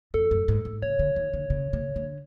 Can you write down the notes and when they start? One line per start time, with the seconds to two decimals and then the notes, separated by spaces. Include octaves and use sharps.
0.14 F2 A4
0.31 F#2
0.48 G#2
0.65 G#2
0.82 C#3 C#5
0.99 D3
1.16 D#3
1.34 D3
1.50 C#3
1.73 C#3
1.96 D3